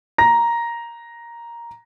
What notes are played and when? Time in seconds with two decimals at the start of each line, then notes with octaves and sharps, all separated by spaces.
0.18 A#5 A#6